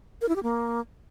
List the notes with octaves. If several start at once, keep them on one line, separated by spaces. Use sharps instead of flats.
A#4
E4
G4
A#3